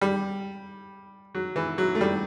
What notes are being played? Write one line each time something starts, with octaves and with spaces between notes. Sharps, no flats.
G3
F#3
E3
F#3
A3
G3